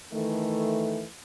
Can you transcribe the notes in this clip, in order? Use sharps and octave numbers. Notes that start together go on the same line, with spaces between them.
D#3 E3 A3